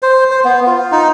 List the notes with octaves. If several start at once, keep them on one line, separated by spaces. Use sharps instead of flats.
C5
C5
B3
F4
D#4